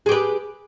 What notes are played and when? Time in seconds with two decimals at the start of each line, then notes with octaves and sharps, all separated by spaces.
0.06 G#4
0.09 G4
0.12 B4